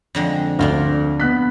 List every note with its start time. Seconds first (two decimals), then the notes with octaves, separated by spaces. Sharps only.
0.15 F2 D3 G#3
0.59 D2 D4 F4 A#4
1.20 B3 F#6 B6